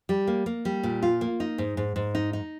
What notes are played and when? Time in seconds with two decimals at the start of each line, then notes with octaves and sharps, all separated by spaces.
0.09 G3
0.27 A#3
0.46 A#3
0.65 G3
0.83 A#2
1.02 F4
1.21 A#3
1.40 D#4
1.58 G#2
1.77 G#2
1.96 G#2
2.15 D#4
2.33 D#4